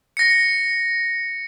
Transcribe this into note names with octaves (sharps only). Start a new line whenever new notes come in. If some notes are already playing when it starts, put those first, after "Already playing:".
A#6 C#7